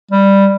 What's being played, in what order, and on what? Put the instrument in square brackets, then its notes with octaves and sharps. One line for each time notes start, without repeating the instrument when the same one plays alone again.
[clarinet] G3